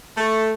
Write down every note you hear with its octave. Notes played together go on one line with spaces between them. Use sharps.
A3